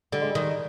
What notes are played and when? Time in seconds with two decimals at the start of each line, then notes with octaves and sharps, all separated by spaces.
0.12 D3 G3
0.21 G#3
0.30 G3
0.35 D#3